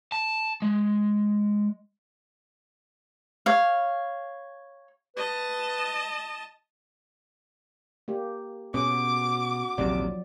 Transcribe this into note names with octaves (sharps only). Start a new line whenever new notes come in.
A5
G#3
C#5 F5
B4 D#5 A5
A#3 G4
B2 C#4 F#4 G#4 D6
A#1 D#2 C3 F3 F#3 D5